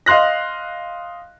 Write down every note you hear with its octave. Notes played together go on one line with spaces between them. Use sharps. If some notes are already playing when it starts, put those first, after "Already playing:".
D#5 F5 C6 F#6 A#6